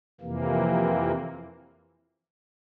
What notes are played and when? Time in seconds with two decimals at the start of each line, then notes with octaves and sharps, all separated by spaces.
0.20 F2 C3 E3 A#3